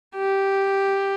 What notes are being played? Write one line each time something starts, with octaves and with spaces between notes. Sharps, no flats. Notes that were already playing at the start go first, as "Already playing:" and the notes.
G4